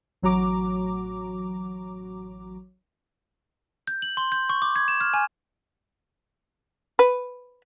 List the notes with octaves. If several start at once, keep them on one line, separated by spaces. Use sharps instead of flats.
A1 F#3 F#4 A#5 D6
G6
F#7
C6
G6
C#6
D6
G#6
E7
F6
G#5
B4